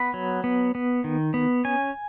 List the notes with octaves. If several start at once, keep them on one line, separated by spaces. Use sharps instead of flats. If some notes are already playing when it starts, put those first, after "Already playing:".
Already playing: B3 B5
F#3
B3
B3
D#3
B3
C#4 G#5